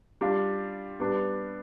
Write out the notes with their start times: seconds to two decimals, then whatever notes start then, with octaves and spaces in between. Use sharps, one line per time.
0.21 G3 D4 F4
1.00 G3 B3 D4